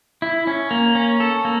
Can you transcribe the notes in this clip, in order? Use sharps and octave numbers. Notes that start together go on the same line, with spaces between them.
E4
C#4
A#3
C#4
A4
A#3